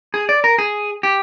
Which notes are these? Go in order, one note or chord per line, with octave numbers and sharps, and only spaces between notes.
G#4
D5
A#4
G#4
G4